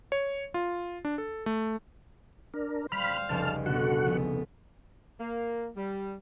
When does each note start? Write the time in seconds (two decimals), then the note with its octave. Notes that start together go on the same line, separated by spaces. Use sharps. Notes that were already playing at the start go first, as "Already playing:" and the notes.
0.12 C#5
0.54 F4
1.05 D4
1.18 A4
1.46 A3
2.54 D4 A#4
2.92 G3 C5 F5 B5 F6
3.29 F1 C#2 A5 F6
3.66 B2 D3 F#4 A4 F#5
4.06 F1 B3
5.20 A#3
5.77 G3